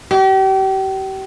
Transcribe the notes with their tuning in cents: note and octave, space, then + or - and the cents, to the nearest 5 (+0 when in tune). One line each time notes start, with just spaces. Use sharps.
G4 -35